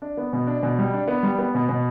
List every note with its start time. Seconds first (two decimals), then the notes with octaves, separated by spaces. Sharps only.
0.02 D4
0.17 B3
0.33 B2
0.47 D4
0.63 B2
0.78 G3
0.94 D4
1.08 B3
1.23 G3
1.39 B3
1.54 B2
1.69 B2